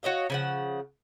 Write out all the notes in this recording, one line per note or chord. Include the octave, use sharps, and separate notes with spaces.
F#4 C#5 D#5 F5
C#3 F3 F#5